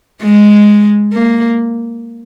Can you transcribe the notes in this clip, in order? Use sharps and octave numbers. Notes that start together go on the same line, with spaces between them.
G#3
A#3